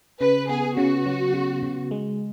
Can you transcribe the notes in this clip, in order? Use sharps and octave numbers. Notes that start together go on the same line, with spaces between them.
C#3 B4
B3 G#4
C#3 F#4
F#3
C#3
C#3
G#3